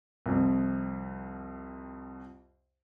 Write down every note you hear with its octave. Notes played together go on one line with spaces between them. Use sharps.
C2 F2